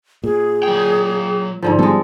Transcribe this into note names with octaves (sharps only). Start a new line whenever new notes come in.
A#2 G#4
F#3 G5
G#2 D3 F3
G3 G#3 B3 A4